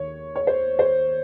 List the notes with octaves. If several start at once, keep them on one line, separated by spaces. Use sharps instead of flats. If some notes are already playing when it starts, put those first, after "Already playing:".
Already playing: D#2 D#3 C#5
C#5
C5
C5